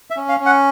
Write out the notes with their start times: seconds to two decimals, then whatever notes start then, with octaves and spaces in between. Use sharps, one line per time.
0.10 E5
0.17 C#4
0.29 F5
0.40 C#4
0.46 F#5